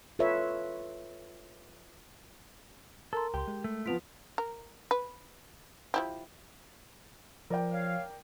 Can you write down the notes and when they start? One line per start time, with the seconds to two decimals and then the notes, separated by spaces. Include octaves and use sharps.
0.19 F4 A4 B4 C#5 E5
3.13 A4 A#4 A#5 C6
3.34 C#2 G4 G5 C6
3.48 G#3
3.64 A3
3.86 F3 B3 F4 B6 D7 F7
4.38 A#4
4.91 B4
5.94 F3 E4 G4
7.50 F3 A#4 D5 G5
7.72 C#5 F5